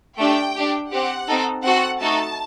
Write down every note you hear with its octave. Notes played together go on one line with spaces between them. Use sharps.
A3 D4 G4 G5
D4 G4
C4 G4 F#5
C4 D#4 A4
C4 F#4 A4 F#5
A3 D#4 F#4 A4 A5